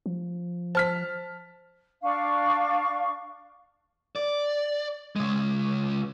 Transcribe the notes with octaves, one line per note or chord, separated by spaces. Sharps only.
F3
C5 A5 F6 B6
D4 F5 C#6
D5
C#3 G#3